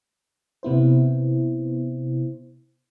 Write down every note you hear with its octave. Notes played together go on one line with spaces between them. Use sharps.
C3 B3 E4 C5